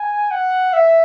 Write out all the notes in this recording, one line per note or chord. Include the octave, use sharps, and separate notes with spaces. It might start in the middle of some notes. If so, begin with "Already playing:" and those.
Already playing: G#5
F#5
E5